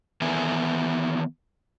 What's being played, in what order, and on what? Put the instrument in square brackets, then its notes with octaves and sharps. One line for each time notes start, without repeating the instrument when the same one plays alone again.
[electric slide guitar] D#3 E3 B3 A4 E5 G#5